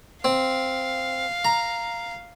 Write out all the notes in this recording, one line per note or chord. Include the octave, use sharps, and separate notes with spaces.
C4 F5
A#5